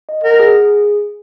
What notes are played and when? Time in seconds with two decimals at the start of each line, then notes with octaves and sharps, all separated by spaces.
0.09 D#5
0.24 A#4 F#5
0.40 G#4
0.55 G#4